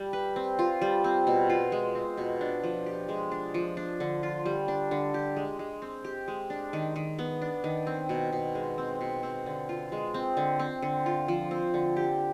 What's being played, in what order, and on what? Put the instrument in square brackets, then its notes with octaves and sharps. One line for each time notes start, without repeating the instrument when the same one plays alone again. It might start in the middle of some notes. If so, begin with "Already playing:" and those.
Already playing: [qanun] G3
B4
C4
F4
G3
C4
B2
F4
G#3
C4
B2
D4
F3
G4
G#3
D4
F3
D4
D3
F4
G3
D4
D3
G4
G#3
G#3
C4
G4
G#3
D4
D#3
D#3
B3
D4
D#3
C4
B2
B2
G#3
C4
B2
C4
D3
F4
G#3
C4
D3
C4
D3
F4
F3
C4
D3
G4